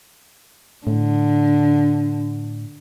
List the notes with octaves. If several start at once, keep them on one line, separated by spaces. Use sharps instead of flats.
A2 D3